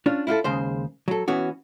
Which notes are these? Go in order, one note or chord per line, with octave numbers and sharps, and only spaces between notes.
C#4 D4 F4
E4 F4 G4 A4
D#2 C#3 G#3 C5
F#3 A4
E3 B3 C#4 F#4